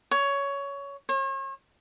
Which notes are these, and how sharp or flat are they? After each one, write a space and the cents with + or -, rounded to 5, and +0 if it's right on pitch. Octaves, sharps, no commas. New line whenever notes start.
C#5 +15
C#5 -40